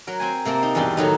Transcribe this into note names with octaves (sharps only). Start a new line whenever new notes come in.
F#3 A#4
C4 C5 G#5
C3 A#3 C4 A5
D#4
E2 G2 B2 G3 G4 C6
A2 D#3 F#3 D#4